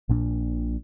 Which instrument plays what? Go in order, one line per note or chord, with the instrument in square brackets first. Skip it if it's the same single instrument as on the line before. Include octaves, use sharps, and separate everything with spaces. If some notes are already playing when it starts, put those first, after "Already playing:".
[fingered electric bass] A#1 A#2 D4